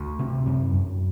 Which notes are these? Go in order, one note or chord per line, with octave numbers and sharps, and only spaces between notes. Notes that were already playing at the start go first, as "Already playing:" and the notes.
Already playing: D2 D4
C3
F#2
F#2